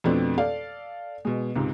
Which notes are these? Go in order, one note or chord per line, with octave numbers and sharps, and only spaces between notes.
F2 B2 A3 C4 D4
A4 D5 F5
B2 G#3
C#2 G#2 C3